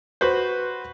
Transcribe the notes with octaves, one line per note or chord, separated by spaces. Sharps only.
F#4 B4 C5